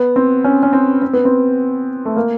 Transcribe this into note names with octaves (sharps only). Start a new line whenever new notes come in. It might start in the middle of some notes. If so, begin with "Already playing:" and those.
Already playing: B3
C4
C#4
C#4
C4
C4
B3
C4
A3
A#3